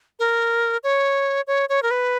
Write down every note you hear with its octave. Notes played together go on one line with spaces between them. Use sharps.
A#4
C#5
C#5
C#5
A#4
B4